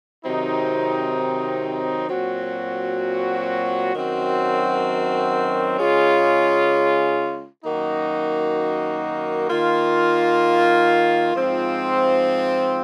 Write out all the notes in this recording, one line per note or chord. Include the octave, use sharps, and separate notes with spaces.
C3 D#3 F#3 C4 D#4
A#2 F#3 C4 F#4
F#2 D#3 F#3 C4 F#4
C#3 G#3 C#4 F4
F#2 D#3 A#3 D#4 F#4
D#3 A#3 F4
G#2 F3 C4 F4